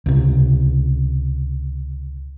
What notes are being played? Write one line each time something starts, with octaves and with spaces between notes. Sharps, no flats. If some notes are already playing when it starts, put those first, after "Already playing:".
C#2 C3